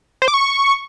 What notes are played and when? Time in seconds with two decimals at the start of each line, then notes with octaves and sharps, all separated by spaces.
0.22 C5
0.28 D6
0.34 C#6